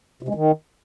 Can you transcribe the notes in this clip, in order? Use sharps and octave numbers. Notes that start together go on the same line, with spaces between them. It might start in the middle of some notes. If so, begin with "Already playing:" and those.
C3
G#3
D#3